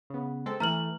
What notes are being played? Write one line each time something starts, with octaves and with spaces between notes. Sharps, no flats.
C#3 B3
G#3 C4 A4
E3 A3 A#5 F6 F#7